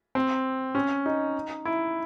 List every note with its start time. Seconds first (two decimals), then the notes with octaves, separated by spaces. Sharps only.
0.15 C4
0.75 C#4
1.06 D#4
1.65 E4